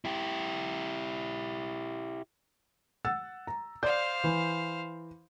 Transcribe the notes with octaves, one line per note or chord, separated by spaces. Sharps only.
E4 G4
F#5 E6 A6
A#5
C5 D5 F5 G6
E3